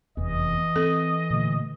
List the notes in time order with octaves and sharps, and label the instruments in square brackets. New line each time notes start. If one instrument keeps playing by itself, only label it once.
[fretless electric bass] F1 E2 [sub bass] E3 [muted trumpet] D#5
[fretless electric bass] C4 [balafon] A4
[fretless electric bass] A#2 D3 A3